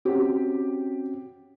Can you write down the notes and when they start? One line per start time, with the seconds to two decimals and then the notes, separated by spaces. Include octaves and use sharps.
0.05 C4 C#4 F#4 G4